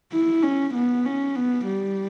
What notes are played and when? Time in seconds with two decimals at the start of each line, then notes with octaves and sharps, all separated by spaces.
0.12 E4
0.43 C#4
0.75 B3
1.05 C#4
1.36 B3
1.66 G3